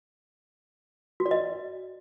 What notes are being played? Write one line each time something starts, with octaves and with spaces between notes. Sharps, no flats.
F#4
D5
D#5